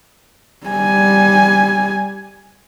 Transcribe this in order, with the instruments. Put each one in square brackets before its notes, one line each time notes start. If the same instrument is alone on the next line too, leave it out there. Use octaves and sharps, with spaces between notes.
[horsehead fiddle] G3 G#5